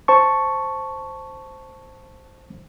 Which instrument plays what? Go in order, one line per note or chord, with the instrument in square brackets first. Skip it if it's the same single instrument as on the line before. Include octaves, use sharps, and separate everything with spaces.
[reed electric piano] C5 A5 C#6